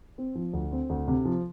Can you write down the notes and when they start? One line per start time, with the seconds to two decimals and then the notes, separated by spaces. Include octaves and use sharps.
0.18 C4
0.35 F3
0.53 D2
0.72 C4
0.89 D2
1.08 C3
1.25 F3